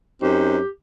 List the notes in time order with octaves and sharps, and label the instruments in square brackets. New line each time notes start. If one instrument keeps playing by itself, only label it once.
[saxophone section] F#2 C4 D#4 [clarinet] G4